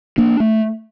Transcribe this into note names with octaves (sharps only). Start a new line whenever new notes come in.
A#3 D4
A3